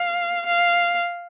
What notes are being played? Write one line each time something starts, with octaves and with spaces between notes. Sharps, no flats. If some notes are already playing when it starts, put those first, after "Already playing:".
Already playing: F5
F5